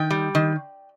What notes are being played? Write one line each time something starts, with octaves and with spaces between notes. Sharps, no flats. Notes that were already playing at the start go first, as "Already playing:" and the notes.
Already playing: D#3 G5
G3
D#3